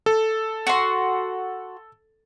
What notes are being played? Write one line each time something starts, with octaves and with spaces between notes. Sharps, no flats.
A4
F#4 C6